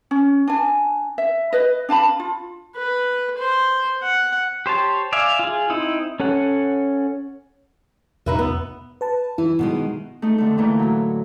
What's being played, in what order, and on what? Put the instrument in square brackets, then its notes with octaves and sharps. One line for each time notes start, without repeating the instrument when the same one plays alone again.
[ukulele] C#4
D4 G#5
E5
B4 D#5
D4 F5 A5 B5
F4
[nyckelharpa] B4
C5
F#5
[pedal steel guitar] G4 C5 C#5 A5
D5 E5 F5 G#5
F4 G#4
C4 D#4 E4
C#4 A4 C#5 F#5
[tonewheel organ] E2 B2 [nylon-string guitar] D#4 B4 E5
[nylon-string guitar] B3
[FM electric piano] B4 A5
[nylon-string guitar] E3 [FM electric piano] E4
[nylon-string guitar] B2 D#3 G#3
[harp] A3 D#4
F2 D3 A3
D3 E3 A3 A#3
A2 F#3